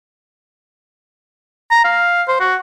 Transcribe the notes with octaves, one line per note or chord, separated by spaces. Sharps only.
A#5
F5
C5
F#4